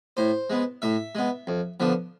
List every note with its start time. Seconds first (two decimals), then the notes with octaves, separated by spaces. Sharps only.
0.17 A2 C5
0.50 G#3 B3
0.82 A2 E5
1.15 G#3 B3
1.47 F2
1.80 D3 F3 B3